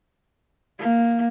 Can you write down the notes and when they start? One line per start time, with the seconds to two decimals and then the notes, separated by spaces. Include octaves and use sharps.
0.79 A#3